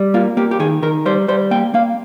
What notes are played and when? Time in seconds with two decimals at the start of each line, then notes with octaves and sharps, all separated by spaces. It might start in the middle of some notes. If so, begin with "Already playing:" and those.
Already playing: G3
0.14 A#3 F4
0.37 A#3 G4
0.51 G4
0.60 D#3 G#4
0.83 D#3 A#4
1.06 G3 C5
1.28 G3 C5
1.51 A#3 G5
1.74 A#3 F5